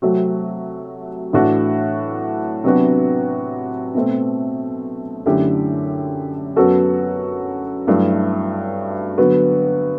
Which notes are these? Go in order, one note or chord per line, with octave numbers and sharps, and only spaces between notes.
C3 F#3 A3 C4 F#4
A2 E3 A3 D4 F#4
C3 F#3 B3 D4 F#4
B2 A3 C4
F#2 D3 A3 E4 G4
F#2 F#3 B3 F#4 A4
G2 F#3 A3 E4
D3 F#3 B3 F#4